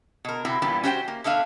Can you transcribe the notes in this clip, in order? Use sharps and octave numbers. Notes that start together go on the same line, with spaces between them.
B2 A#4
C3 C4 E4 F#4
G2 A#2 E3 G3 B3
C#4 F#4 G4 B4 C5 G5
A#3
B2 A3 D4 E5 F5